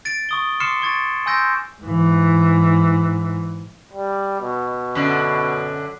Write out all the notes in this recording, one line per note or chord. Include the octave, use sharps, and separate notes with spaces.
A6 D7
C#6 D#6 G7
C6 D6 F6 C7 C#7 E7
C#6 G#6 A6 D7
G#5 C6 E6 G6 A#6 D7
G#2 E3
G3
B2
F#2 D3